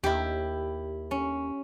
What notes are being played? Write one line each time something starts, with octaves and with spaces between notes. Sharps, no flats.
D#2 E4 G4
C#4